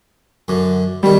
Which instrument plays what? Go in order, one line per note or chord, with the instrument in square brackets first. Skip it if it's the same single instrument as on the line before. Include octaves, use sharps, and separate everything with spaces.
[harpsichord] F#2 D3
[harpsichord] B2 D#3 C#4 [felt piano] G3